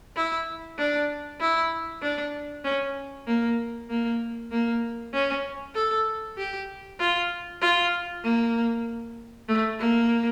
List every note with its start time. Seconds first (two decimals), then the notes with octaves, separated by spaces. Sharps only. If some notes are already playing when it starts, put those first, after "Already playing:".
0.16 E4
0.78 D4
1.41 E4
2.02 D4
2.64 C#4
3.27 A#3
3.90 A#3
4.51 A#3
5.13 C#4
5.75 A4
6.38 G4
6.99 F4
7.62 F4
8.24 A#3
9.48 A3
9.79 A#3